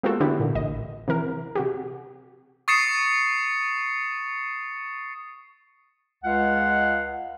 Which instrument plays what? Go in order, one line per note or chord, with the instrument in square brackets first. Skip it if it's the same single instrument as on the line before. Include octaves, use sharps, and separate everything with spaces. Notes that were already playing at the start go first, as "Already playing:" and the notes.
[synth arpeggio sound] G#3 A#3 B3 F4 F#4 A4
D3 B3 D4 E4 F#4 G4
A#2 D3
A1 D#5
C3 E3 A#4
C3 F#4 G4
[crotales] C#6 D#6 A6 C7 C#7 E7
[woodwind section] C#2 G#3 F4 F5 F#5